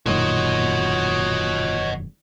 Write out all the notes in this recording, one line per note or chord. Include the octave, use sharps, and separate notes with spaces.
E1 F#2 A#2 D#3 F#4 C#5 D#5